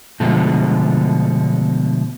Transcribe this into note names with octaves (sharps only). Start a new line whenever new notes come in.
B2 D3 F3 G#3 A3